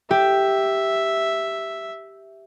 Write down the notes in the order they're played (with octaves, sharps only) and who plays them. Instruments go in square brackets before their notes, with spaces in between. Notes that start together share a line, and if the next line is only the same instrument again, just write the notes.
[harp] G4 [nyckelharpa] E5